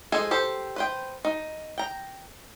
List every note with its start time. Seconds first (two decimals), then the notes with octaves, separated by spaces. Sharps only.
0.12 F3 G#3 D#4 G#4 A4
0.31 G4 A4 C5
0.76 B4 C5 G5
1.25 D#4
1.78 G5 A#5